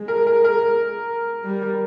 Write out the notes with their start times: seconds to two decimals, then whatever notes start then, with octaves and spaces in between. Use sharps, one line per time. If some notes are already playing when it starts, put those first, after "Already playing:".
Already playing: G#3
0.08 A#4
0.27 A#4
0.44 A#4
1.45 G3